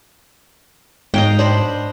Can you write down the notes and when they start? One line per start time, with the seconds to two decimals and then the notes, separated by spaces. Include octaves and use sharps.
1.14 G#2 D#5 F5 G5
1.39 D4 C5 B5